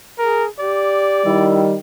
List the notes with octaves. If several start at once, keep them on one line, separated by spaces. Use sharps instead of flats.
G#4 A#4
G4 D5
D#3 G3 E4